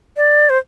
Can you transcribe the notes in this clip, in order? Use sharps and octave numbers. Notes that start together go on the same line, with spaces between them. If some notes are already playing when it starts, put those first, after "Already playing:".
D5
C5